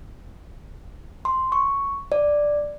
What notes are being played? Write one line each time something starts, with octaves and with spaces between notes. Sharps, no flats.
C6
C#6
D5